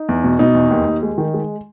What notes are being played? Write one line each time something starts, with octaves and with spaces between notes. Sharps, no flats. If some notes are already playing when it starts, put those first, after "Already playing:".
Already playing: D#4
E2
B2
B2 D#4
E2
D#2
D#2
G#3
D#3
G#3